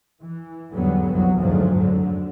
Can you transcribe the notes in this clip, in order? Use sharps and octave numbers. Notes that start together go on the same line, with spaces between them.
E3
E2 G#2 D3 F#3 G3 B3
C2 F2 F#3
F#1 D2 G#2 F3 F#3
F2 D3